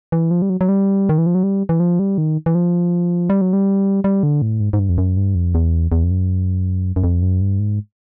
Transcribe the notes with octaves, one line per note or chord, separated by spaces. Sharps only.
E3
F3
G3
F#3
F#3
G3
D#3
E3
F3
F#3
G3
E3
F3
G3
D#3
E3
F3
G3
F#3
G3
G3
D3
A2
G#2
G#2
G2
F2
F#2
G2
F2
E2
E2
F2
F#2
F#2
F2
F#2
G2
G#2